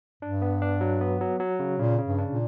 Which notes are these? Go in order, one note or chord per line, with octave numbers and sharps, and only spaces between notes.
G2 D4
B3
D4
F#3
B3
F#3
F#3
C#3
A#2 C#3
C#3
G2
D4
A#2